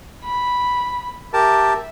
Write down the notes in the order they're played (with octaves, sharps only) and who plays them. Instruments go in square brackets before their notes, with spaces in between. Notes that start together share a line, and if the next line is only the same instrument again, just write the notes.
[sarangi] B5
[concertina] G4 A#4 A5 [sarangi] E5